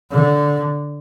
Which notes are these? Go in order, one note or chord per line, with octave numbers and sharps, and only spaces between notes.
D3